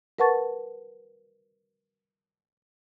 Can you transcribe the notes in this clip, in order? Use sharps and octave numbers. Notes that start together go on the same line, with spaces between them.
A#4 B4 F#5 A5 C#6 A6